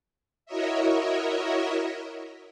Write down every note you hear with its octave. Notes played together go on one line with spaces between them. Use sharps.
E4 F#4 A#4 C#5 D#5 E5